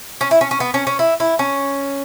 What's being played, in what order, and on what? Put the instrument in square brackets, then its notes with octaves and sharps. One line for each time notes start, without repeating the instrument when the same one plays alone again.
[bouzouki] C#4
E4
C#4
C#4
B3
C#4
C#4
E4
E4
C#4